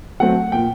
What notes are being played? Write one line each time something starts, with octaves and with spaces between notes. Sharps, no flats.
F#3 A3 C4 F#5
A#2 G5